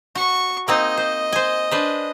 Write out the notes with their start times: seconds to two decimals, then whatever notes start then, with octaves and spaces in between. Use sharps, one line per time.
0.15 F#4 C#6
0.68 A#3 C4 D#4 D#5
0.97 C5
1.32 C5 G#5
1.71 D4 B4 C5